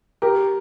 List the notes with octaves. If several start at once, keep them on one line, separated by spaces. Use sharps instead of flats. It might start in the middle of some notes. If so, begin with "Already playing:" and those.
G4 A#4